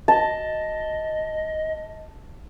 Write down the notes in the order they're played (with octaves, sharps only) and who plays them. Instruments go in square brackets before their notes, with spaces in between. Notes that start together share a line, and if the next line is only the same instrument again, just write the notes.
[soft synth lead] D#5 [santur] A5